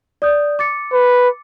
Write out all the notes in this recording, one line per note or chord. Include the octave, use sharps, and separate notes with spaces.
D5 D#6 G6
D6 A6 C#7
B4